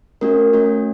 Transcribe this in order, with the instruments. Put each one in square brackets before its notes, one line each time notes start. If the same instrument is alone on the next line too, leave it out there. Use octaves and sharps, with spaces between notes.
[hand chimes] A3 C#4 F#4 A#4
A3 C#4 F#4